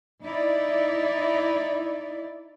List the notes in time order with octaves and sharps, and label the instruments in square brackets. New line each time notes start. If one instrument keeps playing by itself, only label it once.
[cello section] D#4 E4 D5